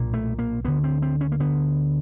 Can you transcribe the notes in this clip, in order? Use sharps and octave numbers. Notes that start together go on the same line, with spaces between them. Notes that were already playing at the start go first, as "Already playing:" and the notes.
Already playing: B1 A#2
A3
A#3
D2 D3 B3
C4
C4
C#4
A#3
D2 D3 B3